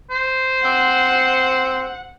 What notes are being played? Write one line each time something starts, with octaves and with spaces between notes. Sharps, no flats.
C5
C4 F#5